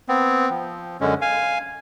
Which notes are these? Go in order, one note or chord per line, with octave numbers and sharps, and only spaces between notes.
B3 C4
F3
F#2 D3 G#3 C#4
F5 G#5